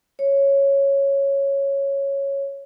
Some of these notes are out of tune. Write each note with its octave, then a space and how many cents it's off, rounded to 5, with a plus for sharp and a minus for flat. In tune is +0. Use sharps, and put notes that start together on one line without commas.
C#5 -5